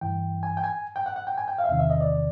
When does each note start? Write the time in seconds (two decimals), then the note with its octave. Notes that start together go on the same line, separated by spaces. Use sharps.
0.01 G2 E3 G5
0.43 G#5
0.57 G5
0.64 G#5
0.96 G5
1.06 F#5
1.16 F#5
1.27 G5
1.38 G#5
1.48 G5
1.58 F5
1.64 E5
1.69 E2 C3 D#3 F5
1.79 E5
1.90 D#5
2.01 D5